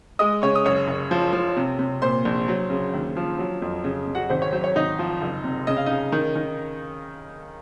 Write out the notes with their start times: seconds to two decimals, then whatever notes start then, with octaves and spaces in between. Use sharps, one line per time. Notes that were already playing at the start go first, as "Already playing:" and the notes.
0.19 G#3 D#5 D#6
0.42 C#3 C#5 C#6
0.55 D#6
0.65 F#1 C#5 C#6
0.88 F#1
1.11 F3
1.33 F3
1.57 C3
1.79 C3
2.02 A#2 C5 C6
2.25 A#1
2.48 F#3
2.70 C#3
2.94 D#2
3.17 F3
3.39 F#3
3.62 F2
3.84 C#3
4.07 C#3
4.15 F#4 F#5
4.30 G#1 C5
4.42 C#5
4.52 F#3 C5
4.64 C#5
4.76 G#1 D#4 D#5
4.99 F3
5.21 F#1
5.44 C3
5.67 C#3 D#5
5.77 F5
5.86 C#3 D#4 D#5
6.12 D#3
6.35 D#3